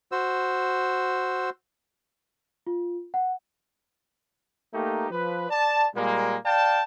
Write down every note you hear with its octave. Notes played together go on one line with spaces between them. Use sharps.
F#4 C5 E6
F4
F#5
A3 A#3 D#4 G4
F3 B4
D5 A5
A#2 G3 G#3 A#3
D5 F5 G5 A5